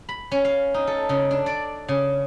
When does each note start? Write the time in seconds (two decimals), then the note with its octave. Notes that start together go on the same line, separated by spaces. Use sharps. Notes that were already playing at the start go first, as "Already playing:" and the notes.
0.09 B5
0.31 C#4
0.45 F5
0.74 D#4
0.87 A4
1.09 C#3
1.31 D4
1.46 D5
1.88 C#3